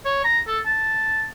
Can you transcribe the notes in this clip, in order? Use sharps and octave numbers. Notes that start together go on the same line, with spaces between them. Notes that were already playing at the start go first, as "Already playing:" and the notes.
C#5
A#5
A4
A5